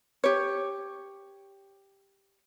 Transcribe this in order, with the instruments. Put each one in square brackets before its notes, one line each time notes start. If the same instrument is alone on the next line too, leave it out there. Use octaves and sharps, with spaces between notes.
[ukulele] G4 C#5